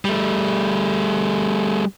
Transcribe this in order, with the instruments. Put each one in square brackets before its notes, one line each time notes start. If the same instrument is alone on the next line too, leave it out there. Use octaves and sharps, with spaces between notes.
[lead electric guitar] G3 A3